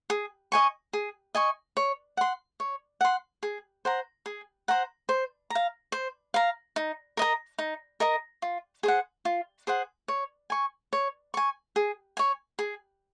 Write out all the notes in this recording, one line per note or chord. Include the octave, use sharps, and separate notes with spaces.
G#4
D#5 G#5 C#6
G#4
D#5 G#5 C#6
C#5
F#5 C6
C#5
F#5 C6
G#4
C5 F#5 A#5
G#4
C5 F#5 A#5
C5
F5 A#5
C5
F5 A#5
D#4
A#4 D#5 A#5
D#4
A#4 D#5 A#5
F4
G#4 C5 F#5
F4
G#4 C5 F#5
C#5
G#5 C#6
C#5
G#5 C#6
G#4
C#5 G#5
G#4